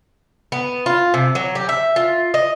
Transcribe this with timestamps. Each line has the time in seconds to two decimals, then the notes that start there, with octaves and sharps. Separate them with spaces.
0.52 B3
0.86 F4
1.14 C3
1.35 F#3
1.55 G4
1.69 E5
1.96 F4
2.34 D#5